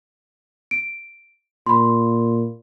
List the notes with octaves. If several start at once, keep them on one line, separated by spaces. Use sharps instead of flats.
D7
A#2 B5 C6